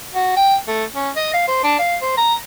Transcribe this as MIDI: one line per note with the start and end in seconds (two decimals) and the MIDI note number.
0.14 0.33 66
0.37 0.56 79
0.68 0.84 57
0.95 1.10 61
1.16 1.33 75
1.33 1.45 77
1.48 1.61 72
1.64 1.75 62
1.79 1.97 77
2.02 2.15 72
2.17 2.35 82